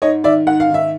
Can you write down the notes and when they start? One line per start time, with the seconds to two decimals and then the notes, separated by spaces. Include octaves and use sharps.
0.02 G#2 C#5 D#5
0.24 D#3 D5 E5
0.47 G#2 F#5
0.60 F5
0.69 D#3 E5